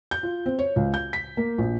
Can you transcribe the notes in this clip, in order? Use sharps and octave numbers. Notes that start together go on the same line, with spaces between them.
G6
F4
C4
C#5
C#2
G6
B6
A#3
A#1